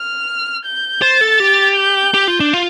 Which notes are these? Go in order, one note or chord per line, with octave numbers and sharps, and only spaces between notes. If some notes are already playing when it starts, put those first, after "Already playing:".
Already playing: F6
G6
C5 A6
A4
G4
G6
G4
F4
D4
F4